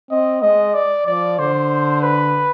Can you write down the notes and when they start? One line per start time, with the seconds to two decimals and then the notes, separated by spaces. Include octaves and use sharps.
0.11 C4 D#5
0.42 G#3 D#5
0.74 D5
1.07 F3 D5
1.39 D3 C5
2.02 B4